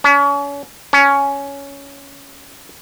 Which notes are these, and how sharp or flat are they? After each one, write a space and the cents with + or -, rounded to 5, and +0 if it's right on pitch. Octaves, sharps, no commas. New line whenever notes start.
C#4 +35
C#4 +10